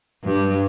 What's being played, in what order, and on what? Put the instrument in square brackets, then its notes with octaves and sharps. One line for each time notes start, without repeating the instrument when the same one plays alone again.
[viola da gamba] G2